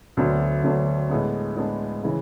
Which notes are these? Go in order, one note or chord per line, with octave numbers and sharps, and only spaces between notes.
D2 D3 F#3 B3 D4
D2 D3 F#3 B3 D4
A2 G#3 B3 D4
A2 G#3 B3 D4
C#3 E3